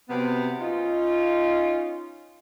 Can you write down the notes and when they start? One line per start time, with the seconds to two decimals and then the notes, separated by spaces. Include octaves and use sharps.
0.09 C3 F#3 B3
0.60 C#4 D#4 F4